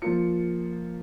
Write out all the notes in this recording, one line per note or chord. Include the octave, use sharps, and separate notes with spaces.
F3 A#3 F4 C#7